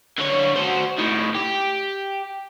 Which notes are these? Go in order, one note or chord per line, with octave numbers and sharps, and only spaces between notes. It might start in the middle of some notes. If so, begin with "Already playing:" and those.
D3 C#5
F#4 C5
A2 D#3
G4